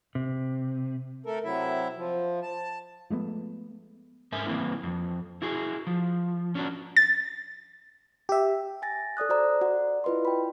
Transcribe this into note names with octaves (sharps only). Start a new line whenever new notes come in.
C3
A3 A4 A#4
C3 F#3 E4 E5
F3
A5
F3 G#3 A3 B3
G#2 A#4 E5 G#5
E3 A#3 C4 E4
F2
E4 F#4 G#4
F3
C#4 D4 F#4
A6
G4 E5
G#5 A6 A#6
A4 D5 D#6 F#6
F#4 C5 D5 A#5
F#4 D5 F#5
E4 F4 B4 D#5 C6
G5 B5